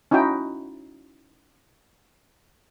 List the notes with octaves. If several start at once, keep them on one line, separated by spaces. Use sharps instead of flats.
C#4 D#4 E4 F#4 G5